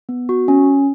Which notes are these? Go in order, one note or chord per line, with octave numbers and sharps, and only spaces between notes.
B3
F#4
C#4